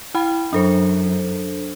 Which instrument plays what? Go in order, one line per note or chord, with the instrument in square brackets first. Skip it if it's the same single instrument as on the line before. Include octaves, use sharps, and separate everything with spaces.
[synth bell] E4 G5 B5
[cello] F#2 [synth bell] D4 A4 C5